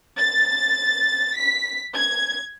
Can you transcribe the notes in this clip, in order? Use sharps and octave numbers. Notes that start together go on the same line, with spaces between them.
A6
B6
G#6